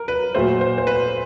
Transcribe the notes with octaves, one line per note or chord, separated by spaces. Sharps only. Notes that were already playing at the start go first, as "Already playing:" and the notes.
Already playing: A#4
B4
A#2 F#3 A3 C5
C5
C5
B4